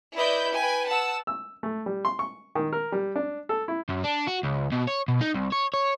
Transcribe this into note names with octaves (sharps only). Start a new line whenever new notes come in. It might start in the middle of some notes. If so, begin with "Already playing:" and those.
E4 B4 D5 D#5 G6
B4 G5 G#5
F#5 A5 E6
E6
A3
G3
C6
C#6
D#3
A#4
G3
D4
A4
E4
F#2
D4
F#4
C#2
B2
C#5
B2
D#4
C2
C#5
C#5